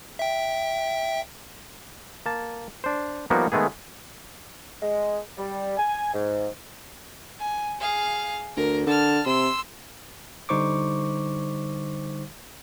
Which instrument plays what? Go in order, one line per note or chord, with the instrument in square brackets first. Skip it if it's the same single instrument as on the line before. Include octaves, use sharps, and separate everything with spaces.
[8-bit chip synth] E5 G5
[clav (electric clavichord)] A#3 A5
D4 C5
F3 G3 A#3 B3 D#4 F#4
D#3 G#3 A3 B3 G#4
[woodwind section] G#3
G3
G#5
G#2
[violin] G#5
G#4 F5
[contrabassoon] D2 [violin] A#4
[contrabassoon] D3 [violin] A5 F6
[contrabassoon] C3 [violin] C6 E6
[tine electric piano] D3 G3 D#4 C5 C#6 D6